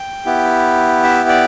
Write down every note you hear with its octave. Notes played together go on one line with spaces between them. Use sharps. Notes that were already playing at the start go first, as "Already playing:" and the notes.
Already playing: G5
B3 E4 G4
E5
D5